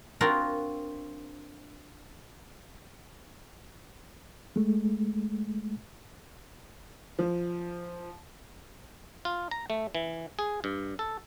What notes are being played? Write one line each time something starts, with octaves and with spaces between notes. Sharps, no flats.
C4 D4 F4 F#4 A#4 A#5
G#3 A3
F3
F4
A#5
A3
E3
G#4
G2
A4